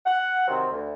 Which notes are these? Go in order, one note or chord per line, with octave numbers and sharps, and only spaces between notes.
F#5
C3 D#3 F#3 C4
D2